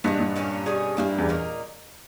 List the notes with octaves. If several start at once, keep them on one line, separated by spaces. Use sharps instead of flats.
G2 A#2 G#3 B3
G2
A#2 A#3 C#4 G4
B2 G3 C#4 G#4
G2 G3 A#3 E4
E2
A#2 A#3 D#4 A#4